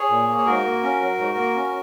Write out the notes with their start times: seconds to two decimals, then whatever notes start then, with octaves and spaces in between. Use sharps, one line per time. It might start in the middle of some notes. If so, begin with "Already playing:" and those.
Already playing: G#4 C#5
0.10 A#2
0.28 A#3
0.38 C#5
0.46 G#2 F#4 A#4
0.65 A#3
0.82 C#4
1.00 F#3
1.18 G#2
1.37 A#3
1.54 C#4